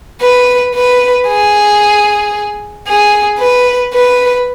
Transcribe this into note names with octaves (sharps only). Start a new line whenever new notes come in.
B4
B4
G#4
G#4
B4
B4